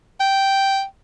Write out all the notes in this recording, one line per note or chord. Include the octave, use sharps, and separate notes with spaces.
G5